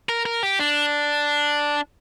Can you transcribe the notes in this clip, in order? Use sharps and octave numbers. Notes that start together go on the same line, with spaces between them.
A#4
A#4
G4
D4